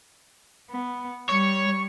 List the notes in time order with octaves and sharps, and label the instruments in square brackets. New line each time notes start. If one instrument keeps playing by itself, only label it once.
[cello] B3
[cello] G3 [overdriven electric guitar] C#5 [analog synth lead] C#6